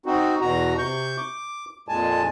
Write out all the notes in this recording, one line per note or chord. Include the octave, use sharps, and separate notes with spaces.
C4 D#4 F#4
E2 B2 F#4 A#5
C3 C#6 G6
D6
F2 A#2 G#3 G#5 A5